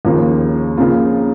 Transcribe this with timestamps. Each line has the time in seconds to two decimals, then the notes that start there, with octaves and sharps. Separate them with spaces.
0.05 D#2 C#3 F3 A#3
0.77 C#3 F3 A#3 F4